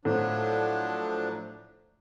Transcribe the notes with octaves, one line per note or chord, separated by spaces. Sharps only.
A2 F3 F#3 D4